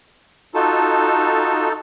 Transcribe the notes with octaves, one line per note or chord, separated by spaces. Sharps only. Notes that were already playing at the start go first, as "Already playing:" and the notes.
D#4 F4 F#4 A4 A5